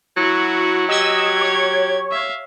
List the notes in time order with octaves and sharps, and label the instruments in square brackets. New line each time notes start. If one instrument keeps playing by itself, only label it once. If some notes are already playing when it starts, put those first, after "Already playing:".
[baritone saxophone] F#3 [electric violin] E4 F#4
[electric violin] G4 G#6 [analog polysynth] D#5 E6
[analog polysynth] C#5
[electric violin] E5 F5